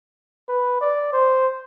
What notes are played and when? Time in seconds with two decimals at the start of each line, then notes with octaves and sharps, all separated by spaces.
0.49 B4
0.81 D5
1.13 C5